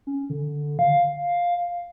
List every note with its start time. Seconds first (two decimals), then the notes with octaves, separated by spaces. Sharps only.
0.07 C#4
0.30 D3
0.79 F5